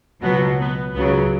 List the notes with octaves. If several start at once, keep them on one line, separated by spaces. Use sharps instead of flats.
C#2 B2 F#3 B3
B3
C#2 C#3 F#3 B3